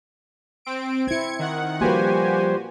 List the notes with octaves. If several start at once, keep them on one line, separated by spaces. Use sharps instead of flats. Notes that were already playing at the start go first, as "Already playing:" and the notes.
C4 D7
C4 E4 G#6 C#7
D#3 F#5
F3 G3 A#3 F#4 G4 B4 C5 G#5